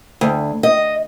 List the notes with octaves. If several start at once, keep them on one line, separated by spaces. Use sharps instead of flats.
D2
D#5